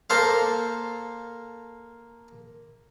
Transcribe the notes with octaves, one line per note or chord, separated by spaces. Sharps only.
A#3 A4 C5 F5